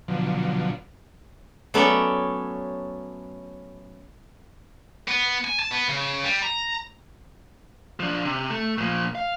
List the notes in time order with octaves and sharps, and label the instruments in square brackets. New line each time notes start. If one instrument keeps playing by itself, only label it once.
[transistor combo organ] B2 D3 F3 F#3
[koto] F#3 A3 B3 C#4 A4 D5
[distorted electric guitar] B3
G#5
A5
B3
C#3
G3
A#5
[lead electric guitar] F3 D4
C3
A3
A#2 F3
F5